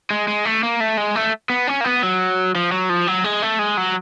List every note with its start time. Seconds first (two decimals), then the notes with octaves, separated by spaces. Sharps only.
0.10 G#3
0.28 G#3
0.45 A3
0.63 A#3
0.80 A3
0.97 G#3
1.15 A3
1.50 B3
1.67 C#4
1.81 A#3
1.84 B3
2.03 F#3
2.55 F3
2.72 F#3
2.89 F3
3.07 F#3
3.24 G#3
3.42 A3
3.59 G#3
3.77 F#3